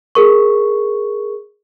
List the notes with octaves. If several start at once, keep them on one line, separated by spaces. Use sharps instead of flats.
G#4 A#4 C#6